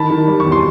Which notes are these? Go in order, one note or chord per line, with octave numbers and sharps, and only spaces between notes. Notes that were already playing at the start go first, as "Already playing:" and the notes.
Already playing: D#3 A5 B5
D#3
G3
C#6
E2
C6